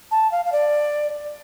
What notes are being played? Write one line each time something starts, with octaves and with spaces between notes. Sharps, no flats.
A5
F5
F5
D5